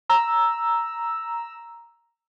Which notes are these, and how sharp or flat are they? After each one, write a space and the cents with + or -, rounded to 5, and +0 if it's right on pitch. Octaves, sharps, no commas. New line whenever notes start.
A#5 +0 E6 +0